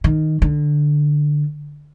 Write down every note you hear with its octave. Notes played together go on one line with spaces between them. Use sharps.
D#3
D3